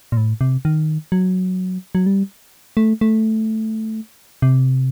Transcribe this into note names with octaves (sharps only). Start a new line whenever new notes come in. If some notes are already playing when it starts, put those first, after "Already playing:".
A#2
A2
C3
D#3
F#3
F#3
G3
A3
A3
C3